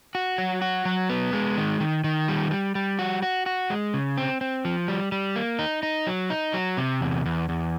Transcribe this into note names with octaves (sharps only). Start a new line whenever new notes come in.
F#4
F#3
F#4
F#3
B3
G#3
D#3
D#3
D#3
G3
G3
G3
F#4
F#4
F#4
G#3
C#3
C4
C4
F3
G3
G3
A#3
D#4
D#4
F#3
D#4
F#3
C3
E2
E2
E2